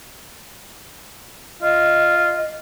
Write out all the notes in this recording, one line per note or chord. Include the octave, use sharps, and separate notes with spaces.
F4 D#5